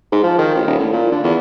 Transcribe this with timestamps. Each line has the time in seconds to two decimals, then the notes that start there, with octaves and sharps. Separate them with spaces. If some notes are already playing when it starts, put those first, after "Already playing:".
0.12 G#2
0.23 F3
0.39 D#3
0.55 A1
0.67 D#1
0.79 A2
0.92 A#2
1.11 D3
1.24 E2